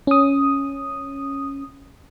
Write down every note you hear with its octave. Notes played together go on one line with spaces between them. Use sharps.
C#4 D#6